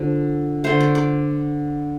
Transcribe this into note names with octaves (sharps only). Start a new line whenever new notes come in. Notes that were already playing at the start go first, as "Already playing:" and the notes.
Already playing: D3 F3 A3
D3 A3 C5
D5
D5